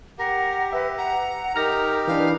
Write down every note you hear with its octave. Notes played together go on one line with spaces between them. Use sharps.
G4 A#4 F#5
B4 E5
F#5 A#5
D#4 G4 A#4 F6 A#6
E3 D4 B4 F5